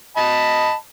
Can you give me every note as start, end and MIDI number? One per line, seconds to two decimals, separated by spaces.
0.17 0.73 75
0.17 0.73 81
0.17 0.73 83